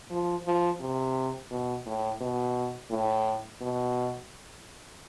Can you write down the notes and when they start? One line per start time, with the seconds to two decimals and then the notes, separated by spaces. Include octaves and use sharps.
0.11 F3
0.45 F3
0.81 C3
1.51 B2
1.86 A2
2.21 B2
2.91 A2
3.61 B2